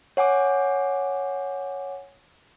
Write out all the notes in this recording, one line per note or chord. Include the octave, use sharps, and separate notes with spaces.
C#5 F#5 G#5 D6